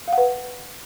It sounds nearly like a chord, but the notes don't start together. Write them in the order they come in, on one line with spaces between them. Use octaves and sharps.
F5 F#5 B4